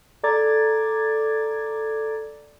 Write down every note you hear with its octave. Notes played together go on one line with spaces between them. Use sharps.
A4 D5 A#5 D6 G#6 A6